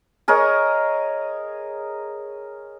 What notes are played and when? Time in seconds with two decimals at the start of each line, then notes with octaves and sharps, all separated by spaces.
0.28 G#4 A#4 C#5 D#5